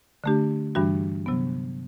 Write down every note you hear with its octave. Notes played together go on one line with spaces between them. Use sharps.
D3 A3 D4 G4
G2 E3 G3 D4 F#4
C3 F#3 B3